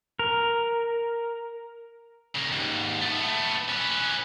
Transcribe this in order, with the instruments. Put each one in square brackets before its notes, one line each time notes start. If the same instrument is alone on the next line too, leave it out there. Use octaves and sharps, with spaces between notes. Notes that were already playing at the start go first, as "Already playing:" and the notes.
[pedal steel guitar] A#4
[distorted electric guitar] C#3 A#3
D#2 G#2
A3 B3
C#4 B4